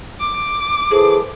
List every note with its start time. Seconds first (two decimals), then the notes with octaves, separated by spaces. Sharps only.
0.20 D6
0.91 E3 G#4 A4 C5